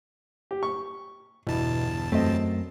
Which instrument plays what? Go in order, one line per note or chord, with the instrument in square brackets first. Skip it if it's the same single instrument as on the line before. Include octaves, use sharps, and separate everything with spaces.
[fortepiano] G4
C#6
[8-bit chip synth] G1 E2 A5 [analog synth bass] B2 [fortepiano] E3
[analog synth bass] F#2 [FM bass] A3 [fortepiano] C4 D#5